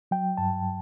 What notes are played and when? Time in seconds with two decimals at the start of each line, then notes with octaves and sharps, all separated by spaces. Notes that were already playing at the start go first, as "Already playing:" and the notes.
0.11 F#3 G5
0.37 G2 A5